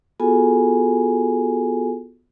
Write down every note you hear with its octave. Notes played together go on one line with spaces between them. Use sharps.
B3 F4 F#4 G#4 A4 G#5